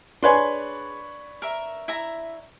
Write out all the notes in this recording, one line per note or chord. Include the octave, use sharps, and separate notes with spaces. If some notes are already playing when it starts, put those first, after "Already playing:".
D4 G#4 B4 C#5 C6
A#4 E5
E4 E5 A#5